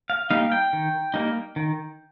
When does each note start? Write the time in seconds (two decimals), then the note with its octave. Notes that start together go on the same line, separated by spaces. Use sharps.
0.10 F5
0.30 G3 A#3 D#4 F5
0.52 G5
0.73 D#3
1.14 G3 A#3 D#4
1.56 D#3